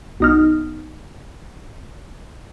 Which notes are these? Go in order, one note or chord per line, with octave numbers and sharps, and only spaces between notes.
B1 D#4 F6